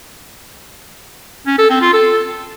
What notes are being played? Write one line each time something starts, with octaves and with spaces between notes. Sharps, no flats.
C#4
A4
C4
F4
A4